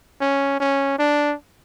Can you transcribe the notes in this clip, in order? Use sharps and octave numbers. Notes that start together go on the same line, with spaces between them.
C#4
C#4
D4